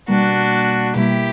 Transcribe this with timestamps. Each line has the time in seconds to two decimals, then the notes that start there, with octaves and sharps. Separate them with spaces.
0.08 B2 G3 A#3 D4 F#4
0.95 B2 G3 A#3 E4 G4